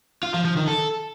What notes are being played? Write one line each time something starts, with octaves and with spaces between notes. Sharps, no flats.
F4
F3
F3
D#3
A4